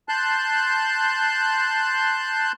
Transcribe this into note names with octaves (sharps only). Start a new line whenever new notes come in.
A5 C6 F#6 G6